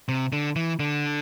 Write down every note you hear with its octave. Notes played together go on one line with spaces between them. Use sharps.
C3
D3
E3
D3